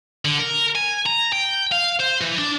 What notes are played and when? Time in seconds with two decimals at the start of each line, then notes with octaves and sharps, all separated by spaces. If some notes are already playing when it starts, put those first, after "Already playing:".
0.25 D3
0.39 A#4
0.76 G#5
1.06 A#5
1.33 G5
1.72 F5
2.00 C5
2.21 E3
2.39 D4